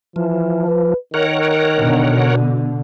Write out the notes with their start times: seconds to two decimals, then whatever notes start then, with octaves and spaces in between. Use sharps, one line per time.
0.16 E3 F3
0.67 B4
1.14 D#3 A#4 C#5 F#5
1.78 B2 D3